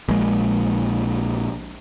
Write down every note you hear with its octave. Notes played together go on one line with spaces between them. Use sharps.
A#1 G#3